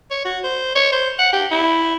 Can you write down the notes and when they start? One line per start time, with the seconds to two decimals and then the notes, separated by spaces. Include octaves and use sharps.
0.11 C#5
0.25 F#4
0.44 C5
0.76 C#5
0.92 C5
1.19 F#5
1.33 G4
1.51 E4